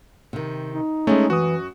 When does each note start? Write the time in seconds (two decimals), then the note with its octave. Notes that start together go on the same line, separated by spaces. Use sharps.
0.33 C3 D#3
0.73 D#4
1.07 G#3 A3 C#4 G#4
1.30 F#2 E3 F#4 D#6